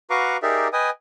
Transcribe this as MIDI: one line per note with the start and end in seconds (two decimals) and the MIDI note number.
0.10 0.37 66
0.10 0.37 71
0.10 0.37 77
0.10 0.37 82
0.10 0.37 85
0.10 0.37 86
0.43 0.68 63
0.43 0.68 67
0.43 0.68 68
0.43 0.68 70
0.43 0.68 74
0.43 0.68 76
0.73 0.90 71
0.73 0.90 75
0.73 0.90 79
0.73 0.90 80
0.73 0.90 87